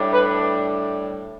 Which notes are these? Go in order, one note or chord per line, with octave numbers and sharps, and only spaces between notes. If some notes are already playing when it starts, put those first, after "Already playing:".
Already playing: A2 G3 D4
B4